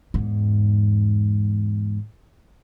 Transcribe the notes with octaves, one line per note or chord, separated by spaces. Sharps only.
E2 G#2